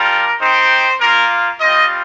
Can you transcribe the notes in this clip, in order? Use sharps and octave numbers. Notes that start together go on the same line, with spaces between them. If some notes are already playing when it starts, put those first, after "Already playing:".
Already playing: G3 D4 F4 A#4
C4 D#4 G4 C5
A#3 F4 A#4
G3 C4 F4 D#5